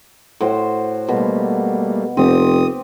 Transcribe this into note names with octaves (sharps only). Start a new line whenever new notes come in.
A2 F#4 C5
B2 G3 A3 A#3
F1 C4 G4 D#6